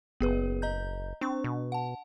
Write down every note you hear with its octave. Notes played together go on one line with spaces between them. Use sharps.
F#1 B3 G#4 B4
D#5 A#5 G6
C4 D4 C#6
B2
F#5 A5